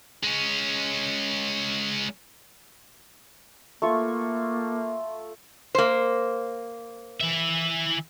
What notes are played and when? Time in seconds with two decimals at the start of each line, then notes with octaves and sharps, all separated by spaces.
0.24 G#3 C#4
3.82 A3 A#3 F4 C#6
5.75 A#3 C5
7.21 E3 E5